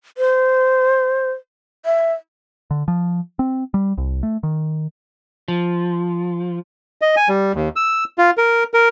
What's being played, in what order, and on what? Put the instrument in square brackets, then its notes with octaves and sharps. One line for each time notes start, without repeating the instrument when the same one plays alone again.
[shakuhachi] C5
E5
[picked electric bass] D3
F3
C4
G3
C2
A3
D#3
[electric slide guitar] F3
[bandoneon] D#5
G#5
G3
D#2
E6
F4
A#4
A#4